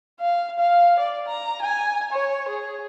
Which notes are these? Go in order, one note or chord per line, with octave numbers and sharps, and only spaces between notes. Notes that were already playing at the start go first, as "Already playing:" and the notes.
F5
F5
D5
A#5
G#5
C#5
G#4